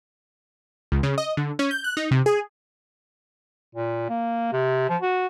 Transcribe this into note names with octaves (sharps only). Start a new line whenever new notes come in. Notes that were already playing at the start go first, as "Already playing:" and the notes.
C#2
C#3
D#5
D3
C#4
G6
F#6
D#4
C3
G#4
A#2
A#3
C3
F3
F#4